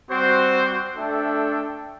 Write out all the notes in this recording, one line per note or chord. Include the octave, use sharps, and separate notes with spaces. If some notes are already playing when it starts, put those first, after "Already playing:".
G3 C4 F#4 C5
A3 D4 A4 E5 G5